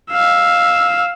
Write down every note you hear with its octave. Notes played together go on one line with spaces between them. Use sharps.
F5 E6